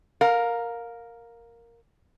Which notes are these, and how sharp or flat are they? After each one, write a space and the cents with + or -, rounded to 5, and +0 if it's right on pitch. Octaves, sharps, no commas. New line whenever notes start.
A#4 +0 F5 +20